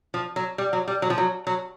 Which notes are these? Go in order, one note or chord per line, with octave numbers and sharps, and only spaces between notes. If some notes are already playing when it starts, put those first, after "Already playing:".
F3
F#3
G3
F#3
G3
F#3
F3
F#3
F#3